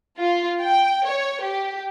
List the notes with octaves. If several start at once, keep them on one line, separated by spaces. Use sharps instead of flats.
F4
G5
C#5
G4